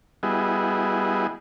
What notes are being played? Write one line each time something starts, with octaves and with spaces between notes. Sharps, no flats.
G3 B3 E4 F#4 G#4 D#5